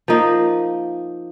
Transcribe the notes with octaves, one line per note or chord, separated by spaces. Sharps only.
F3 A#3 D#4